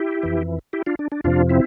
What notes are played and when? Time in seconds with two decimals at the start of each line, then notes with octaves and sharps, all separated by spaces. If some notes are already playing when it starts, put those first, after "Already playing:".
Already playing: E4 G4
0.23 F2 E3
0.73 E4 G4
0.86 D4 F4
0.99 D4
1.12 D4
1.24 F2 C3 F3 D4 F4
1.49 C4 E4